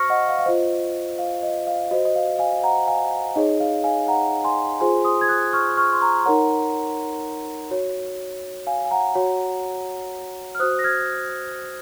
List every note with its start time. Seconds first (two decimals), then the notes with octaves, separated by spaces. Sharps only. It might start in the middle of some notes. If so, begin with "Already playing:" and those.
Already playing: F#4 C5 C#6 F6 A#6 C#7
0.10 D#5 F#5
0.28 F5
0.39 F5
0.46 F4 C5 D#5
1.19 F5
1.43 D#5
1.67 F5
1.91 F#4 C5 D#5
2.05 D#5
2.16 F5
2.39 F5 G#5
2.63 F#5 A#5
2.87 F5 G#5
3.36 D#4 G#4 C#5 D#5
3.60 F5
3.84 F5 G#5
4.08 F#5 A#5
4.44 G#5 C6
4.80 F4 G#4 C5 G#5 C6
5.05 C6 D#6
5.21 G#6
5.29 D#6 F#6
5.53 C#6 F6
5.77 C#6 F6
5.93 C6
6.01 A#5 C#6
6.20 C6
6.25 D#4 A#4 C#5 F#5 A#5
7.71 F#4 C#5
8.67 F5 G#5
8.85 G#5
8.91 F#5 A#5
9.15 F#4 C#5
10.55 F6
10.60 F#4 C5 D#6 F#6
10.79 A#6
10.84 F6 G#6